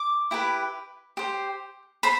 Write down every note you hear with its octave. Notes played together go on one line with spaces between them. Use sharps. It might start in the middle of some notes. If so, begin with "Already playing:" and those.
Already playing: D6
E4 G4 B4
G4 C5
C5 B5